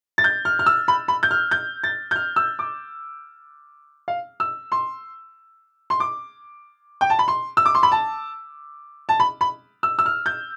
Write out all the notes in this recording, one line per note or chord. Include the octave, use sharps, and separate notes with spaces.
A6
G6
F6
F6
E6
B5
B5
G6
F6
G6
A6
G6
F6
E6
D6
F5
E6
C6
C6
D6
G5
A5
B5
C6
E6
D6
C6
B5
A5
A5
B5
B5
E6
E6
F6
G6